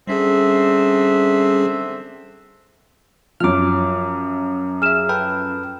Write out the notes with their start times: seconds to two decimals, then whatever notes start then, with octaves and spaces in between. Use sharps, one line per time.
0.07 D3 G3 C4 C#4 G#4 E5
3.40 F#2 F3 D6 F6
4.82 G#4 E5 F6 E7
5.09 A4 B4 G5